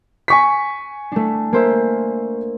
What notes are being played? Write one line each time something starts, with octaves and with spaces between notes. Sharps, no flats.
G#5 C#6 B6
A3 D4
A#3 C5 E5